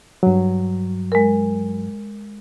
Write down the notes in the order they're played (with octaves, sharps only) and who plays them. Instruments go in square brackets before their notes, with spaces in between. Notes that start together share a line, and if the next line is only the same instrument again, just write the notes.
[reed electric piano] G2 F#3
[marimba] G#3 A#4